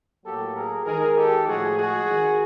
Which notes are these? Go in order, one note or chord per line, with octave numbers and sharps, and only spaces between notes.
A2 F#3 A#3 G4 A4
G#4 A#4
D#3 G#3 G#4 A#4
G4 A4
A2 F3 G#3 F#4 G#4
F#4 G#4
D#3 G#3